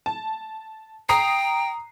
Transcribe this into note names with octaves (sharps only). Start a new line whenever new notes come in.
A5
G5 A#5 D#6 C7